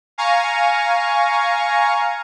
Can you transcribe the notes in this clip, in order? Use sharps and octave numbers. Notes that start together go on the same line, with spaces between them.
F5 G#5 A#5 C#6